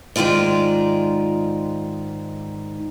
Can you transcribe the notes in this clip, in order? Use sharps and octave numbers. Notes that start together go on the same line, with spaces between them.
G#2 D#3 G#3 F4 D5